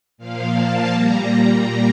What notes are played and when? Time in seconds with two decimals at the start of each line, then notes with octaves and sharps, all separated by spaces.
0.18 A#2 F3 A#3 F5
0.54 A5
0.91 A#2 G3 A#3 A#5